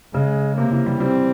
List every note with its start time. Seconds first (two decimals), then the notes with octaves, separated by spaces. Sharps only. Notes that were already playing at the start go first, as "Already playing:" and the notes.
0.14 C#3 G#3
0.58 C3 A#3
0.72 C3 E3
0.86 E3 G3
1.00 E3 G3 C4